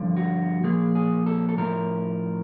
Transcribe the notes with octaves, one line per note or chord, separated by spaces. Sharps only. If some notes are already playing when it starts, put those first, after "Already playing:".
Already playing: G2 D3 F3
F#4
A#2 F3 G#4
G#4
A4
A4
A2 F3 A#4